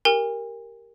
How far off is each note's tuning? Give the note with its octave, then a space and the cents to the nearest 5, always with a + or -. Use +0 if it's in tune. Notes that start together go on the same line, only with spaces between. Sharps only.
G4 +0 A#4 -5 G#5 -45